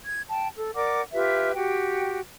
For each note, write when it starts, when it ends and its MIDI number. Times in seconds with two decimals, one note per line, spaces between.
0.04 0.22 92
0.29 0.47 79
0.29 0.47 81
0.57 0.74 69
0.75 1.01 70
0.75 1.01 74
0.75 1.01 78
0.75 1.01 86
1.13 1.52 65
1.13 1.52 67
1.13 1.52 71
1.13 1.52 76
1.55 2.19 66
1.55 2.19 67
1.55 2.19 79